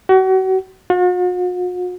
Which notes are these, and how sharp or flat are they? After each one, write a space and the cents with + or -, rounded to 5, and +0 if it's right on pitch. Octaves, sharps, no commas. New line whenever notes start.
F#4 +35
F#4 -45